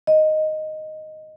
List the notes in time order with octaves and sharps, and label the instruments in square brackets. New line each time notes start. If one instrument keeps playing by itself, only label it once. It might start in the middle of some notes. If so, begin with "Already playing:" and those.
[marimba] D#5